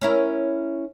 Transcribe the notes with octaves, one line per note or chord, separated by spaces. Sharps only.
C#4 E4 A#4